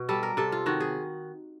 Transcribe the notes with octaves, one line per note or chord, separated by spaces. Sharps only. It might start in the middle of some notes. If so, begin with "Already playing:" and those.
Already playing: B2
G3 A4
A#4
C3 A4
F4
D#3 F#4
G#4